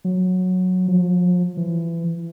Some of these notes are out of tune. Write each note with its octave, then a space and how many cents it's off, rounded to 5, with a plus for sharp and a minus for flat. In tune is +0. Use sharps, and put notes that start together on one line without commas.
F#3 -10
F3 +35
E3 +25